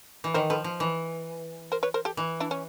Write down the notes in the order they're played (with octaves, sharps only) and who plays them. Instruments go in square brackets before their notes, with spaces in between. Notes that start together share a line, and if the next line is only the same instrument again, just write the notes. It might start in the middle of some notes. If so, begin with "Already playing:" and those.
[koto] E3
[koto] D#3 [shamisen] A#4 C5
[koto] F3 [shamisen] A4 B4
[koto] F3
E3
[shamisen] A#4 C5
B4 C#5
A#4 C5
G4 A4
[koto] E3
[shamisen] D4 E4
C#4